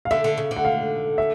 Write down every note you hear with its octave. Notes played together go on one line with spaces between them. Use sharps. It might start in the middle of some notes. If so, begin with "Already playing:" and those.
F5
D3 E5
D3
C#3
D3
F#5
F5
E5